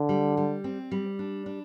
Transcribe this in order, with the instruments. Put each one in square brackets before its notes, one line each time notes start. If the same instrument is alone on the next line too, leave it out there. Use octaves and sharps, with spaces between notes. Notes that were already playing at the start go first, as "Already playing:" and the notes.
Already playing: [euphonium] D3
[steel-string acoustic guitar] G3
G3
C4
G3
D4
D4